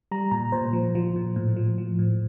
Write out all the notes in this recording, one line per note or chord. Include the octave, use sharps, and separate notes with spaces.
G3 A#5
A#2 A#5
A#2 C5
F3
F3
A#2
A2
F3
F3
A2